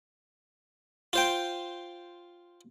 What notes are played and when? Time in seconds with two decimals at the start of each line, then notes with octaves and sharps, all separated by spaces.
1.13 F4 C5 G5